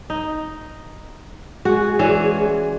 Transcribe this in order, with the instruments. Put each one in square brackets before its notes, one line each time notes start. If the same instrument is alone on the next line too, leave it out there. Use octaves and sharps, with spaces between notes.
[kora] D#4
[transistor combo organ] G#3 G#4 [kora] F#4
[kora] E3 C#4 [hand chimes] F#4 D5